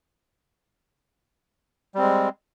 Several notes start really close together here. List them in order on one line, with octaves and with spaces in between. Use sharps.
G3 C4 G#3